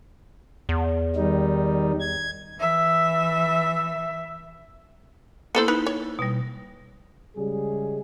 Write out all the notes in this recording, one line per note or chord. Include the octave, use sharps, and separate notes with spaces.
E2
D#3 G3 D#4
G#6
E3 E5
A#3 B3 E4 A4 C5
D#4 B4
C#5
B2 G3
C#3 G3 G#3 G#4